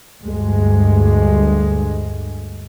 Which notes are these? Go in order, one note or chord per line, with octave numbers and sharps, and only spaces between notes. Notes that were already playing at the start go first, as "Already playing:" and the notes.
D2 G2 G#3